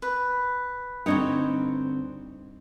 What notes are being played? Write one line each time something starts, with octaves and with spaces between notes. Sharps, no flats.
B4
D2 G2 C4 D#4 C#5 F#5